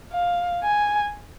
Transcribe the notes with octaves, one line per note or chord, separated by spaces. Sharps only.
F5
G#5